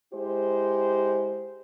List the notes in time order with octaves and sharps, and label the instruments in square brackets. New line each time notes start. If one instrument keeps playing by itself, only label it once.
[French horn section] G#3 E4 G4 C5